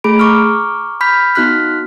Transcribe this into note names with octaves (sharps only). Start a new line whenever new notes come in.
A3 G#4 B5 D7
A#5 C#6 D6 F6
B5 F6 G6 B6
B3 D#4 F#4 F6 F#6 B6